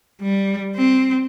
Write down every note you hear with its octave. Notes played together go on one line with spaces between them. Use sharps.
G3
C4